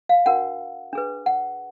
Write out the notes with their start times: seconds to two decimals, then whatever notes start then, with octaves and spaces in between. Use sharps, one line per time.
0.09 F5
0.26 D4 F#4 A#4 F#5
0.93 D4 G#4 B4
1.26 F#5